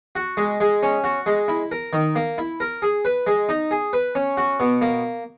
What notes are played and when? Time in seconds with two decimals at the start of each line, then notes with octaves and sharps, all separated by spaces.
0.16 F#4
0.37 G#3
0.60 G#3
0.83 C#4
1.04 F#4
1.26 G#3
1.48 E4
1.72 A#4
1.93 D#3
2.16 A#3
2.38 E4
2.60 A#4
2.82 G#4
3.05 B4
3.27 G#3
3.49 D#4
3.71 G#4
3.93 B4
4.15 C#4
4.37 F#4
4.60 B2
4.82 A#3